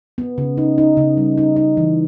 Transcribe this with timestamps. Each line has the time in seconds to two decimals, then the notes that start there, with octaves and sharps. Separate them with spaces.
0.18 B3
0.38 C#3
0.58 D#4
0.78 D#4
0.97 C#3
1.17 G3
1.38 D#4
1.56 D#4
1.77 E3